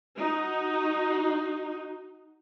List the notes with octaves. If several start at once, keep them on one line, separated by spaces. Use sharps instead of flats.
D#4 F#4